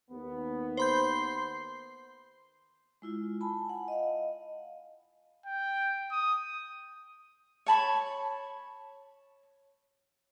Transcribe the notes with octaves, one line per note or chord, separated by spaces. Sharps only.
D#2 B3
C5 B5 C6 G6
G#3 E4 F4
G#5 A5 B5
F#5
D#5 F5
G5
D#6
C#5 A5 B5 C#6